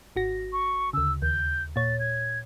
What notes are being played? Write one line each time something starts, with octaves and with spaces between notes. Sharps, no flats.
G#1 F#4 A#6
C#6
D2 C#3 E6
D#2 G6
A#2 C#5 A6
G#6